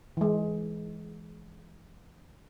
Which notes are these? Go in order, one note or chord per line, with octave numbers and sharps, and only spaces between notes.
E3 G#3